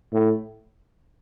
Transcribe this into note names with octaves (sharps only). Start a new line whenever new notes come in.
A2